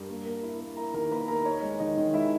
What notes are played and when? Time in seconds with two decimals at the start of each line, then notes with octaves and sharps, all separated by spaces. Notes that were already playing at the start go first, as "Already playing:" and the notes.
Already playing: G2 A#4
0.09 A#3
0.26 A#3
0.43 E4
0.60 A#3
0.77 E4 A#4 A#5
0.94 D#3 A#4 A#5
1.11 A#3 B4 B5
1.28 E4 A#4 A#5
1.45 D#4 C#5
1.62 G#3
1.79 D#3 D#4 D#5
1.97 D#3
2.14 G#3 E4 E5